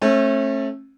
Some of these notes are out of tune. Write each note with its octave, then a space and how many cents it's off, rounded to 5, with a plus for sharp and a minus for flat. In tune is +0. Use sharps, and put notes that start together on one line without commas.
A3 +0 C#4 -40